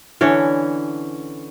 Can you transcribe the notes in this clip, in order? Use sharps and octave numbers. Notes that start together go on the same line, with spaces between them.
D3 E3 C#4 C#5